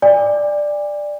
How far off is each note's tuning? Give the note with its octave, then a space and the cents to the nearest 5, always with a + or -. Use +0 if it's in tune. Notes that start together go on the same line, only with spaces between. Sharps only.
D5 +5 G#5 -45